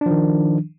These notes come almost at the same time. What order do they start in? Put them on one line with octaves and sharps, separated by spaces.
D4 F3 D#3